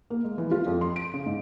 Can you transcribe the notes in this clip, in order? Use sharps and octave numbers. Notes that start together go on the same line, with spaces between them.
A#3
G#3
E3
F4
F2
C6
D7
C#3
G#2